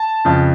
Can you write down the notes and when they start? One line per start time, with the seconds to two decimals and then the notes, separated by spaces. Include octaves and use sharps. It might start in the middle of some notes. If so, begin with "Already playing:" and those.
Already playing: A5
0.25 F2 C#3